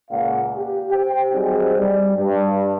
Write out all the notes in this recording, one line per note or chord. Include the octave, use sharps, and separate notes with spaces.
C#2 A#2 F5 F#5
G4
G4 C5 G5
F#3 G3 C4 D#4 G#4
G3
G2